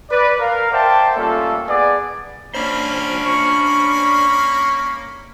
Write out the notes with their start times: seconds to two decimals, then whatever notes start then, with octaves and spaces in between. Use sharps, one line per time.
0.10 B4 D5
0.40 A#4 F5
0.72 C5 D5 E5 F#5 G5 A5
1.17 G3 A3 A#3 C#4 F4 A4
1.68 B3 G#4 D5
2.54 A#3 C#4 D4 C5 B5
3.25 C#6